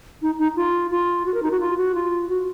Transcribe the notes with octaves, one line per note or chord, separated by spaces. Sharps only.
D#4
D#4
F4
F4
F#4
A#4
D#4
F#4
F4
F#4
F4
F#4